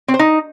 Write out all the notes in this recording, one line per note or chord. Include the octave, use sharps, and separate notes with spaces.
C4
C5
D#4